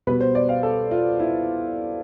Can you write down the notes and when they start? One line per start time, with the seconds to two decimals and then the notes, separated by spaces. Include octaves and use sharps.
0.07 B2 G3 B3 B4
0.21 C5
0.35 D5
0.49 F5
0.63 A4
0.91 F4
1.20 E4